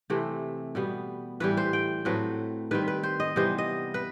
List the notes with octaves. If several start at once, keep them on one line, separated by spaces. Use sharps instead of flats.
C3 E3 A3 C4
B2 G3 B3
A2 E3 G3 B4
C5
G5
A2 F#3 A3 C4 B4
D#3 G3 C4 B4
B4
C5
D#5
C3 E3 G3 B3 C5
D#5
B4